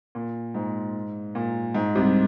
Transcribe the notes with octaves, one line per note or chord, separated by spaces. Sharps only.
A#2
G#2
A#2
G#2
C2 C3